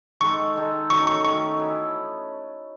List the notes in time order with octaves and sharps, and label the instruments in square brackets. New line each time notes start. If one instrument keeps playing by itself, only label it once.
[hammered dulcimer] D#3 G#3 D#4 A4 [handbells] C#6
[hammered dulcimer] D#3 G#3 D#4 A4
[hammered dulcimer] D#3 F#3 A3 C#4 [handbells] C#6
[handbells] C#6
[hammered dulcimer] D#3 F#3 A3 C#4 [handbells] C#6
[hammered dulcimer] E3 B3 E4